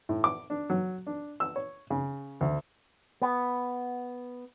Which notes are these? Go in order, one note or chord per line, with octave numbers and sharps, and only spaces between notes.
A2
D6
D4
F#3
D4
E6
C#5
C#3
D2
B3